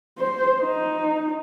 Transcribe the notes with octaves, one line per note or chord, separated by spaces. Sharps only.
C5
D#4